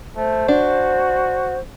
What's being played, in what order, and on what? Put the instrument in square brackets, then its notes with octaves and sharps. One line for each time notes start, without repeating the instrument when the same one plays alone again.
[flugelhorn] A3 [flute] C5
[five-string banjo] D4 [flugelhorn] F#4